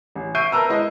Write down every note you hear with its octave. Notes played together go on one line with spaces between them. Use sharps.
A1
E5 C#6 G6 C7 D7 D#7
A#4 B4 A5 A#5 E6
G#3 E4 D#5